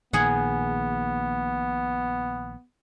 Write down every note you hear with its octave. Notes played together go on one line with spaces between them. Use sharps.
A#1 A#2 D#3 B3 G#4 F#5